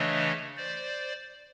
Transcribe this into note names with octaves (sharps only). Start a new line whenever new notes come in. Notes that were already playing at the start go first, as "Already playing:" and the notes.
Already playing: C#3 E3 A3 D4 C#5 D#5
C5 D5